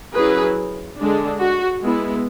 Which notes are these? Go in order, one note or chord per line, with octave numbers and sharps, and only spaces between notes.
F#3 C#4 E4 G#4 B4
D3 G#3 D4
F#4
G#3 B3 E4